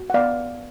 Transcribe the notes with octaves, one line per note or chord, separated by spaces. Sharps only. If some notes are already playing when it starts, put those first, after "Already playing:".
Already playing: F#4
F#5
B3 D5 F5